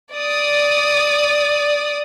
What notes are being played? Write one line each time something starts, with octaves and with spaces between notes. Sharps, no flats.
D5 D#6